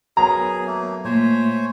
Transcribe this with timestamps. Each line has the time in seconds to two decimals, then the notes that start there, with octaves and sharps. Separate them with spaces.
0.17 F#3 B3 G#4 A#4 G#5 A#5
0.67 A3 A#3
1.05 A#2 A3 A#3 C5 C#5 G#5